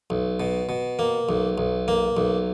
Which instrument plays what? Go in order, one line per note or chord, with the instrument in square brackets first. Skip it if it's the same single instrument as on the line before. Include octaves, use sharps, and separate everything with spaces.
[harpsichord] B1
B2
B2
A#3
B1
B1
A#3
B1